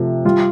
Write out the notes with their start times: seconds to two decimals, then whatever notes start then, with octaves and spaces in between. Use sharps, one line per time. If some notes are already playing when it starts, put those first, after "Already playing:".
Already playing: C3 F3 A3
0.25 G3 F4